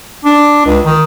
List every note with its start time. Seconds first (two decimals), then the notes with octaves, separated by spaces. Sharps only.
0.25 D4
0.65 C#2
0.85 D#3